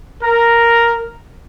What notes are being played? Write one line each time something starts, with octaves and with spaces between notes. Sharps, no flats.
A#4